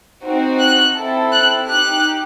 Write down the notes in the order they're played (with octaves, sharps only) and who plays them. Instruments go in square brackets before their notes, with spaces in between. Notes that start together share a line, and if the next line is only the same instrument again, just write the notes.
[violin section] C4 D#4 F#4
F#6
C4 E4 A4
F#6
D#4 G4 F#6